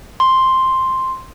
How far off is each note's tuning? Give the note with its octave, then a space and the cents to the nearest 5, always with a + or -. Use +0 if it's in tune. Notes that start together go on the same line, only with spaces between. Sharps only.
C6 +5